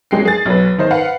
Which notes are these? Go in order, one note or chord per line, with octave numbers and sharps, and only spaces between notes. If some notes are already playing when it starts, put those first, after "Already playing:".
A#1 F#3 G#3 G5 C7
G#4 A6
B1 F#3 B4
D#3 D#4 C5
B4 F5 F#5